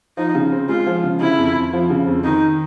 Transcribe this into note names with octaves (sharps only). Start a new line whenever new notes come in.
F3 D#4
C#3
C4
G#3 F4
F3
C#3
C#3 E4
F2
F2
F3
C#3
F2
D#3 D#4